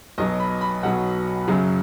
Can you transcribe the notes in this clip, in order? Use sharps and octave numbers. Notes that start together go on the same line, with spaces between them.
B1 B2 F#3 D#5
B5
B5
B1 B2 F#3 F#5
F#2 C#3 F#3